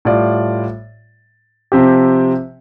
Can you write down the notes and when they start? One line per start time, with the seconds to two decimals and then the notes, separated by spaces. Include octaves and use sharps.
0.05 A2 G3 F4 D5
1.72 C3 F3 C4 G4